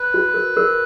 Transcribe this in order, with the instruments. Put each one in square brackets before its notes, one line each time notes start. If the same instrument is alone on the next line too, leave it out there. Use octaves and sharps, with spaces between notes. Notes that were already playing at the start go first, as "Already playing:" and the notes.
Already playing: [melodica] B4
[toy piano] F#4
A#4
A#4